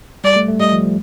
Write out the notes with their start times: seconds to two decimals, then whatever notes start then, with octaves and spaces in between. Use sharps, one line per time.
0.24 G3 D5
0.36 A3
0.48 A3
0.59 G3 D#5
0.72 F3
0.84 F3